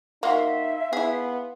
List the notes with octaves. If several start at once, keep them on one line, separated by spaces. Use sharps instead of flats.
A#3 D#4 F#4 E5 F5 C6
B3 E4 G#4